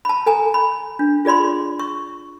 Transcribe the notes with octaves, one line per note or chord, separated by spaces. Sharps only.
A5 B5
A4 G#5 A#5
B5
D4
F4 G#4 D5 B5 C6
C#6